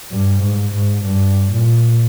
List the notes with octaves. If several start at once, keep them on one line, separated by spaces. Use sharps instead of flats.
G2
G#2
G#2
G2
A#2